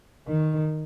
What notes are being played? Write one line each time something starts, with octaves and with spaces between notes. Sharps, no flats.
D#3